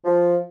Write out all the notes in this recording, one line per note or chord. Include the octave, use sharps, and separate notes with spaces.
F3